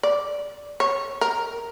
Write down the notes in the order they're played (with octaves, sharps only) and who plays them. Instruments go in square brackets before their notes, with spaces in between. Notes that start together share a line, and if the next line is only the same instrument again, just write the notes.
[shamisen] D5
C#5
A#4